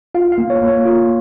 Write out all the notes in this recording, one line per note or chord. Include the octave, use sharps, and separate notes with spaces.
F4 F5
F5
A#3
C#5
A#3
C#5
F4